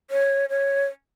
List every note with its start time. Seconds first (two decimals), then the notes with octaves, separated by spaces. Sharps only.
0.11 C#5
0.50 C#5